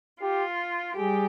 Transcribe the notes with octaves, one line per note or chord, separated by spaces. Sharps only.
F4 G4
G3 G4 G#4